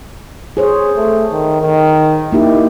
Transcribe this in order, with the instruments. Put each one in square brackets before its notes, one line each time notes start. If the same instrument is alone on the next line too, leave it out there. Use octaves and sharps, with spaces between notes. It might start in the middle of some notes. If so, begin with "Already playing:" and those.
[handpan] G#4 C5 C#5
[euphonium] A3
D#3
D#3
[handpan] A#3 D#4 G4 [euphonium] E4